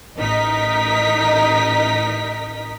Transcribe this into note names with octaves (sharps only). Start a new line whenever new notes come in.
A1 D#4 A#4 D#5 B6